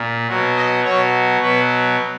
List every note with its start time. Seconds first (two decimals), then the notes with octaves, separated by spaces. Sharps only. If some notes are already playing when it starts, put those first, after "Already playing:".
Already playing: A#2
0.28 B2 F#3
0.56 D#5
0.84 B2 F#3 C#5
1.41 B2 F#3 B4